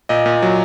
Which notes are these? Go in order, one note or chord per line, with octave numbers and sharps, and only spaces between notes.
A#2 D#5
A#2
F#3